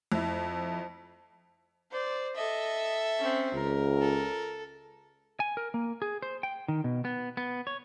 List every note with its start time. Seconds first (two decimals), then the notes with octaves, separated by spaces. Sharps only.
0.12 F2 E4
1.91 C5 D5
2.36 A4 D#5 E5
3.19 C4 C#4
3.54 C#2 A#4
4.01 A4
5.40 G#5
5.57 A#4
5.74 A#3
6.02 G#4
6.22 C5
6.43 G5
6.68 D#3
6.84 B2
7.05 B3
7.37 B3
7.67 C#5